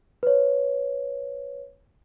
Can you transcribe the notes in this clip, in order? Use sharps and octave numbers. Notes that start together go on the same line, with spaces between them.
B4 C#5